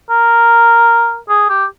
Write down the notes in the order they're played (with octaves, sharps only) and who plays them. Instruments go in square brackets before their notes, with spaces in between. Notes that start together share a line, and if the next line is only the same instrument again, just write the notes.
[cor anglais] A#4
G#4
G4